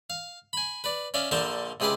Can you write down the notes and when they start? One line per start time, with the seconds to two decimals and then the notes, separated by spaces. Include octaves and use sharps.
0.10 F5
0.53 G#5 B5
0.84 B4 D5
1.14 C#4 D5 E5 F5
1.31 A#1 D3 A4 A#4 C5 A5
1.80 C#2 C3 G#4 B4 C6 D6